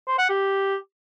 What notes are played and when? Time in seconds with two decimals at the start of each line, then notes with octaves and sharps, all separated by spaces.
0.07 C5
0.18 F#5
0.29 G4